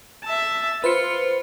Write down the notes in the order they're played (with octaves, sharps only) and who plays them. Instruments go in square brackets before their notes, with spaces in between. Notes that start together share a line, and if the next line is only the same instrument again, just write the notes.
[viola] E5 A5
[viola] F4 [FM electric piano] B4 C5 C#7